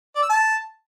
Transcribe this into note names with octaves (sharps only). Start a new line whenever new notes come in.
D5
E6
A5